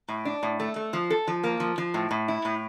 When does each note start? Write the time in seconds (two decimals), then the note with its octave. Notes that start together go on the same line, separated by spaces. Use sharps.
0.08 A2
0.25 D4
0.43 A2
0.60 A3
0.76 A3
0.93 F3
1.10 A4
1.27 F3
1.44 A#3
1.60 F3
1.78 F3
1.94 A2
2.11 A2
2.28 E4
2.45 A2